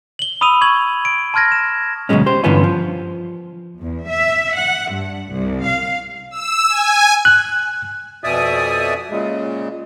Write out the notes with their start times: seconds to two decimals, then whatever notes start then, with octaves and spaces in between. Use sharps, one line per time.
0.19 F#7 G7
0.41 B5 D#6 E6 D#7 F7
0.61 C#6 G#6 F#7
1.05 D7
1.34 A5 C6 F6 G#6 A#6
1.52 E7
2.09 D2 B2 E3 F#3 G#3 C#4
2.26 G4 C5
2.44 G2 D3 E3 B3 C#4 F4
2.64 F3
3.80 E2
4.08 E5
4.57 F#5
4.94 G2
5.32 C2
5.66 F5
6.31 E6
6.69 G#5
7.25 F#6
8.24 F2 B2 D5 E5 G#5 D#6
9.10 A#2 C#3 G#3